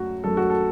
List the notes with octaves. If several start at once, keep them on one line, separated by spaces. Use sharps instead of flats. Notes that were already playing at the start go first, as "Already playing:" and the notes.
Already playing: F#2 F#3 A3 F#4
F#2 F#3 A3 A4
F#4
A4